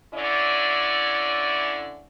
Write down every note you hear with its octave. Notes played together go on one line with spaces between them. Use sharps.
D3 C#4 E4 D5